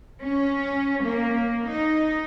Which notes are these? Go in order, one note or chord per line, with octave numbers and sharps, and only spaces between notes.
C#4
A#3
D#4